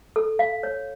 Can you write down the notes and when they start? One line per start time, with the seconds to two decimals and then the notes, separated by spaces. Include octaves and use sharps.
0.16 A4
0.39 F5
0.63 C#5